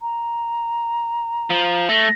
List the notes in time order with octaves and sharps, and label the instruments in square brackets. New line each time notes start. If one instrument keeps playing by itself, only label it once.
[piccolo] A#5
[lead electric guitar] F3
[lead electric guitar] A3 [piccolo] A#6